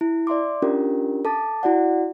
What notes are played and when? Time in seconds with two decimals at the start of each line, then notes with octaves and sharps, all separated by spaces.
0.01 E4
0.27 D5 E5 C6 D6
0.62 C#4 D4 F4 G4 A#4
1.25 A4 A5 D6 A6
1.63 E4 F#4 D5 F#5